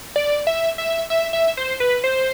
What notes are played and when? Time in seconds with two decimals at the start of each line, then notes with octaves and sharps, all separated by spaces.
0.16 D5
0.47 E5
0.78 E5
1.10 E5
1.33 E5
1.57 C5
1.80 B4
2.04 C5